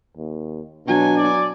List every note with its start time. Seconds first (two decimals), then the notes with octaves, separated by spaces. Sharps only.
0.17 D#2
0.87 B2 F#3 D4 G#5
1.17 D5